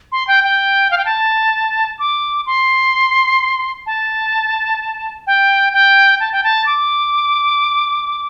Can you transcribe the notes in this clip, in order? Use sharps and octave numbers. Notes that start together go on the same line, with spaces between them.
C6
G5
G5
F5
G5
A5
D6
C6
A5
G5
G5
A5
G5
A5
D6